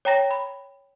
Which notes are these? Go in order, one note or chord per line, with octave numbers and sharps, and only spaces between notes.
C#5 G5 A#5 A#6
B5